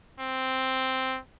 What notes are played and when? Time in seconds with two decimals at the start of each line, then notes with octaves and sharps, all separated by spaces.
0.20 C4